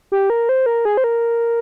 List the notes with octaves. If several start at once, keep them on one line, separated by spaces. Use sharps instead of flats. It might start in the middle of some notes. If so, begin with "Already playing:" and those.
G4
A#4
C5
A#4
G#4
C5
A#4